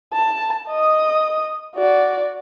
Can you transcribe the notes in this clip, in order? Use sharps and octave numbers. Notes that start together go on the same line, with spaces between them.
A5
D#5 D#6
F#4 D5